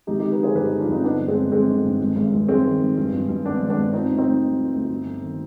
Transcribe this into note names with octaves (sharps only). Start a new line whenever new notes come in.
G#1 D#4 G4
D3 D#4 G4
G4 B4
D3 G#4 C5
G2 G4 B4
D3 D#4 G4
D4 F4
G2 C4 D#4
D3 B3 D4
G1
G#3 C4
G1
G1 G#3 C4
D3
G2
G#1
G#1
G2
G2 G#3 C4
D#3
G#1
G2
G2
G2
G#1 B3 D4
G#1
B3 D4
G2
F3 C4 D#4
D2
C4 D#4
D2
D2
F3
D2
G1
G1
D#3